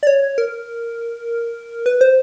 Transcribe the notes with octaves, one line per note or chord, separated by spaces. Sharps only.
D5
C#5
A#4
B4
C5